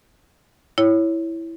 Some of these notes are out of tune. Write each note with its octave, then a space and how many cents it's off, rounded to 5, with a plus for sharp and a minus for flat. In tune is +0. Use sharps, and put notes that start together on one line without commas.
E4 +0 C#5 +0